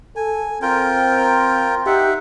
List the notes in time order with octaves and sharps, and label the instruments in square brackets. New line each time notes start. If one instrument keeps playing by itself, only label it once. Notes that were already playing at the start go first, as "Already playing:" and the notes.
[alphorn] A4 [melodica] G#5
[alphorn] C4 [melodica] F4 A#4 G5
[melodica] D#4 E5 F#5 [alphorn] G4